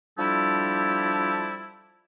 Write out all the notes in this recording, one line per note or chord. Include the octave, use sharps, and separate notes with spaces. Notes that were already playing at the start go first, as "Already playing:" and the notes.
F3 G3 D4 E4 G4 A4